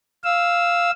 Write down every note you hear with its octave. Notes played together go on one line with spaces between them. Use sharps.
F5 E6